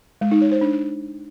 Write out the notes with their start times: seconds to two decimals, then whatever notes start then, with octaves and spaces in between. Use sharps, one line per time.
0.21 G#3
0.31 D#4
0.41 C#5
0.51 C5
0.61 D4